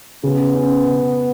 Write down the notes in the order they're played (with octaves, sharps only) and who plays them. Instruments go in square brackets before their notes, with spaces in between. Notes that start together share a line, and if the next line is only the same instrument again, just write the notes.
[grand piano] C#3 [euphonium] B3
[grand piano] C#4
C#3